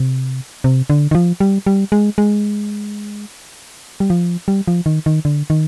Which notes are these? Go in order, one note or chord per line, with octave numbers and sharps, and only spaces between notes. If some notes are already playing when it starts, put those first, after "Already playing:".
Already playing: C3
C3
D3
D#3
F3
G3
G3
G#3
G#3
G3
F3
G3
F3
D#3
D#3
D3
D#3